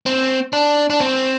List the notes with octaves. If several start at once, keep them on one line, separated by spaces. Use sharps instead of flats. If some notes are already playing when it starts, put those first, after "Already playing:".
C4
D4
D4
C4